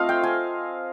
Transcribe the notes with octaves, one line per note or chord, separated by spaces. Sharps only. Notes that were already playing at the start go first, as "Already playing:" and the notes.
Already playing: A3 C4 F4 D#5 F5
G5
G#5